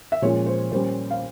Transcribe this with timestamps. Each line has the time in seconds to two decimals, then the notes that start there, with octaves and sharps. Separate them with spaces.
0.12 E5
0.22 A#2 F3 G#3 C#4 C#5
0.46 C5
0.72 A#2 G3 C#4 C5
1.11 F5